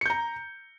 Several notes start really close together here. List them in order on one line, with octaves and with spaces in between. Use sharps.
C#7 G6 A#5